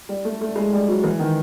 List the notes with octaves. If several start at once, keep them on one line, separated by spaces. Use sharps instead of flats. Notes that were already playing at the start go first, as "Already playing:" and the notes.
G3
A3
A3
G#3
G3
F#3
E3
D#3